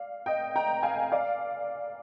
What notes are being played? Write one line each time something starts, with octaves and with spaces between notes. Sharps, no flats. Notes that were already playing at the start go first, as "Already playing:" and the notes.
Already playing: D5 F5
D#5 G5
G5 A#5
F5 G#5
D5 F5